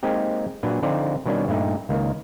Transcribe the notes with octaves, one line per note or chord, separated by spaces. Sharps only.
G#3 A#3 C4 D#4 G4
A#2 F#3 D4 B4
D3 F3 C4 D#4 F4 D5
B2 D#3 G3 C#4 D4
G2 A#2 A3 D#4
C#2 D#3 A#3